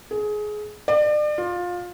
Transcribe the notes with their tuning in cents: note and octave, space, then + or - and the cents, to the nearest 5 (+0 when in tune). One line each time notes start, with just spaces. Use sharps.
G#4 +20
D5 +35
F4 +20